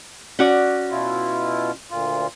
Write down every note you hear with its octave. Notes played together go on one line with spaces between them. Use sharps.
C#4 F#4 D5
B2 E4 F4
D2 A#2 F4